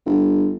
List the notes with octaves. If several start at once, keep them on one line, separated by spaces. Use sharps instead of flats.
G1